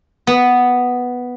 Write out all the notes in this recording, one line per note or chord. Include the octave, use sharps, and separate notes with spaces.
B3